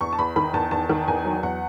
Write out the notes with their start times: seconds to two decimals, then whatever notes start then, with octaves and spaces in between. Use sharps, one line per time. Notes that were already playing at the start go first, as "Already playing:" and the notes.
0.01 E2 C#6
0.13 A5
0.18 E2 B5
0.36 D#3 B5
0.53 E2 A5
0.71 E2 A5
0.89 D#3
1.08 E2 G#5
1.25 F#3
1.43 E2 F#5